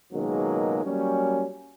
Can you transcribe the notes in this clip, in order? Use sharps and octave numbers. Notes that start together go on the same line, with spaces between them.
C#2 B2 D#3 F#3 G#3 A#3
F#3 G3 A#3 C#4